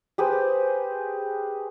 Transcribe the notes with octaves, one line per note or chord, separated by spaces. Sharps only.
G4 G#4 B4 C5